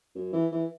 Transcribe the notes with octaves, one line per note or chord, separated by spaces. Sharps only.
F#2
E3
E3